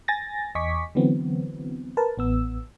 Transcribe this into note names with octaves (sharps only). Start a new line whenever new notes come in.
G#5 A6 A#6
E2 D#5 G#5 C#6 D6 B6
D3 E3 F#3 B3 C4
A#4 B4 A5
A1 B3 E6